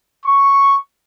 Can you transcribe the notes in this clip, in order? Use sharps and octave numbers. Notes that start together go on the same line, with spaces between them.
C#6